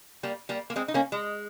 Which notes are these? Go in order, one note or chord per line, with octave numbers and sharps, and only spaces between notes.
G3 A#3
G3 A#3
A#3
G#3 C4
D#4
A#3 C#4
G#3